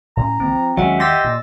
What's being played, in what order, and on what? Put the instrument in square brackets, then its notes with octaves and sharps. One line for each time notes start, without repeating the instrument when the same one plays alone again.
[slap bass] A2 C#4 [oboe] A#5
[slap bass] C#2 D#3 A#3 [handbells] C4
[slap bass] F3
[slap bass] D#2 [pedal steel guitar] F#3 G#3 C#4 [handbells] E5 F#5
[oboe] G4 [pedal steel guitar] D#5 C6 [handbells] E6 A6 A#6
[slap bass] A#2